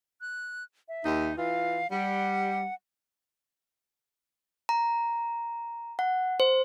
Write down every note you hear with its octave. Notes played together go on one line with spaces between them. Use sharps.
F#6
E5
D#2 D#4
E3 F4 F5
G3 F#5
A#5
F#5
C5